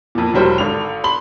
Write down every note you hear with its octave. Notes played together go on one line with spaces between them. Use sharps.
F2 A#2
E1 F#3 G3 C5
G#1 D3 F7
B5 C6 F#7